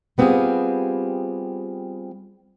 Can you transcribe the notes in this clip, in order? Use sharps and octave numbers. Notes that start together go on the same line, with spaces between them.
G3 B3 C4 F4 G4 G#4